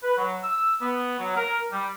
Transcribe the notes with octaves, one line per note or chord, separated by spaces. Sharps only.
B4
F#3
E6
B3
F#3
A#4
G3